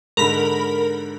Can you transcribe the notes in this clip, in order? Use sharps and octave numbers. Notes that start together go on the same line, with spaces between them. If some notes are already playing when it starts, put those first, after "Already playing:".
G#2 D3 A#4 B5